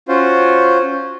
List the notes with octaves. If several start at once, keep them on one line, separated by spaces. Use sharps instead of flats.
C#4 F4 F#4 C5